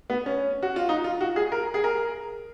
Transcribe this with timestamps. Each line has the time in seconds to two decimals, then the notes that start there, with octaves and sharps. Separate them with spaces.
0.10 B3
0.26 C#4
0.63 F#4
0.76 F4
0.89 D#4
1.04 F4
1.21 F#4
1.36 G#4
1.52 A#4
1.74 G#4
1.84 A#4